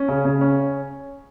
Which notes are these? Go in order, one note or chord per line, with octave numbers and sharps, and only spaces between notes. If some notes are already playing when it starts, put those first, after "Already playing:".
Already playing: C#4
C#3
C#3
C#4